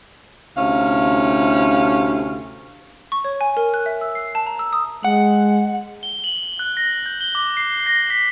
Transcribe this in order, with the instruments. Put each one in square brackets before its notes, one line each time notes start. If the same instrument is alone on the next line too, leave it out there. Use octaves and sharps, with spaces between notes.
[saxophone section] D2 C3 C#4 E4 F5
[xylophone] C#6
C#5
G#5
A#4
F#6
E5
E6
C7
A5
A#5
E6
D#6
[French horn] G#3 [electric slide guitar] F#5
[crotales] G7
F#7
F#6
A#6
G6
G7
D6
C7
A#6
B6